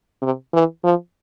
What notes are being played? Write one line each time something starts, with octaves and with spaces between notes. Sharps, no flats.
C3
E3
F3